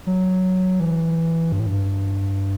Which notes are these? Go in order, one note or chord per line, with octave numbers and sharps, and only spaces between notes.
F#3
E3
G2
A2
G2